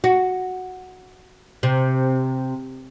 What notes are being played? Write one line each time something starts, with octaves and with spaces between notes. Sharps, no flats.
F#4
C3